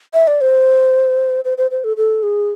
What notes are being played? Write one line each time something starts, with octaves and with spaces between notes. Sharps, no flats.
E5
D5
C5
C5
C5
C5
A4
A4
G#4